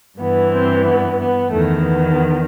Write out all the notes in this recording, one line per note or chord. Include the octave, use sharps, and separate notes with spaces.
G2 E3 B3
C4
B3
B3
E2 D#3 A3
B3